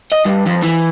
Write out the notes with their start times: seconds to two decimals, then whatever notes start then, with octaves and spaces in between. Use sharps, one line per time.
0.12 D#5
0.25 G2
0.46 F2
0.63 E3